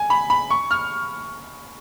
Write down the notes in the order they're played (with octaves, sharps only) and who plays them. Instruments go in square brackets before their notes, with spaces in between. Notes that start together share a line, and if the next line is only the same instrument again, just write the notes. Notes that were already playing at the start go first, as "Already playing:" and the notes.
Already playing: [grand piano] G#5
B5
B5
C#6
F6